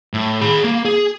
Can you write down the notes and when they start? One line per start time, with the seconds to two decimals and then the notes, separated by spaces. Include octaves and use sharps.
0.14 A2
0.41 G#4 B5
0.64 A#3
0.85 G#4